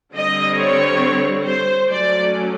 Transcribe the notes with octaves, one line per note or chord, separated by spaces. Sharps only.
D3 G3 C4 D#5
C#5
C5
F#3 A3 C#4 D5